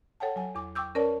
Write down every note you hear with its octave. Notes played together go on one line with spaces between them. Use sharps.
A4 C#5 F#5 G5 A5
F#3 G#5
E2 D6
G5 C#6 D6 E6 G6
C#4 A#4 B4 C#5 D5 A5